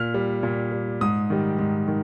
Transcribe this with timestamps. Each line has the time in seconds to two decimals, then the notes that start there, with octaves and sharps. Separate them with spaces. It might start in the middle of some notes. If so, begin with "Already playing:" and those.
Already playing: A#2 F6
0.14 G3
0.43 A#2
0.72 G3
1.01 G#2 D#6
1.30 D#3 G3
1.59 G#2
1.88 D#3